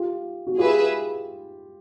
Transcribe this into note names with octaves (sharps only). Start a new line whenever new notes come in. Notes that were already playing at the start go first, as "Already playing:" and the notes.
Already playing: F4 G4
F#4
F4 G4 G#4 B4 E5